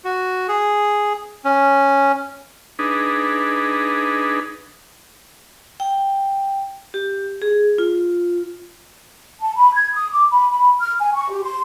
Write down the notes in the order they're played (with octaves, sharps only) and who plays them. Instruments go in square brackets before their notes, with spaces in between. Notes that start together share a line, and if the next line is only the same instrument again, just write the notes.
[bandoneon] F#4
G#4
C#4
[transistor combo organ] D4 D#4 G#4 B4
[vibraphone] G5
G4
G#4
F4
[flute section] A5
B5
G#6
D#6
D6
B5
B5
F6
G#5
C#6
G4
C6